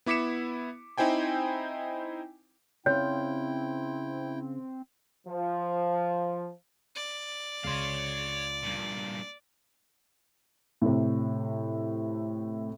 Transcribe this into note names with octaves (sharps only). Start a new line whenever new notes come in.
B3 E4 D6 B6 C#7 E7
C4 D#4 E4 C5 G5 G#5
C#3 C4 E4 F4 C#5 G5
F3
D5
C#2 C#5 F5 C6
G2 A#2
A2 C3